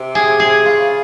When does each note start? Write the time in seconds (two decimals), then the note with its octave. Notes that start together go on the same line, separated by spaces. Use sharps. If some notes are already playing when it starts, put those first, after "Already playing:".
Already playing: C3
0.15 G#4
0.40 G#4
0.66 C#3 F4